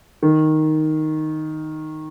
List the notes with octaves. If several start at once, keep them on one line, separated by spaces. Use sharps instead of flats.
D#3